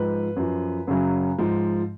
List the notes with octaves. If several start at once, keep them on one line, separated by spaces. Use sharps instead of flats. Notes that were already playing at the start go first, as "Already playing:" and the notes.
Already playing: G#2 F3 B4
F#2 F3
F#2 C#3 F#3
G#2 F3